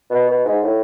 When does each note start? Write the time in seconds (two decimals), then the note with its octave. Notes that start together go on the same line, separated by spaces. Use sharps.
0.10 B2
0.28 B2
0.45 G#2
0.63 A2